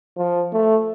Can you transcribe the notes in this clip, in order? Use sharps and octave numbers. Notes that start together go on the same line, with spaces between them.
F3
A3